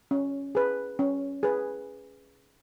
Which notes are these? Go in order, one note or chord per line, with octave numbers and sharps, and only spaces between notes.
C#4
G#4 B4
C#4
G#4 B4